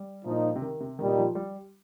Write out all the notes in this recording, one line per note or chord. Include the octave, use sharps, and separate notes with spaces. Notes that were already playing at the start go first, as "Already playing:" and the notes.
Already playing: G3
A#2 F3 D#4
C3
D#3
C3
A#2 D#3 G3 D#4
F3
G3